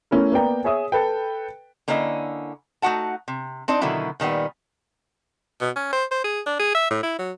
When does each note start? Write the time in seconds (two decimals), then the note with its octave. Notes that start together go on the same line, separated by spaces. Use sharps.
0.11 A3 C#4 E4 A#4
0.32 A#3 B3 D5 G5 A#5
0.64 G#4 C#5 E5 D#6
0.92 A4 B4 G5
1.88 D3 A#3 C#4 E4 D#5
2.82 A3 D#4 F#4 F#5 A5
3.28 C3
3.68 C4 D4 D#4 D5
3.81 B2 D3 D#3 F#3 E4
4.20 A#2 D#3 G3 B3
5.61 B2
5.76 C#4
5.93 C5
6.11 C5
6.24 G#4
6.46 D4
6.59 G#4
6.74 E5
6.91 A2
7.03 E4
7.19 F#3